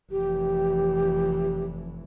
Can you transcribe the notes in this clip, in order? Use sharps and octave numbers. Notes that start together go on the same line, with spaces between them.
F1 E3 G4